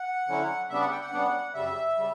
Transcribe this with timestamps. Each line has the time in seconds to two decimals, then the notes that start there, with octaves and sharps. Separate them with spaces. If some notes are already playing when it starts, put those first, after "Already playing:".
Already playing: F#5
0.28 D3 F#3 C#4 E4
0.70 C#3 G3 B3 D4 E5
0.81 F#5
0.91 G5
1.01 F#5
1.12 C#3 G3 B3 D4
1.54 F#2 C#3 G3 E5
1.97 C#3 G3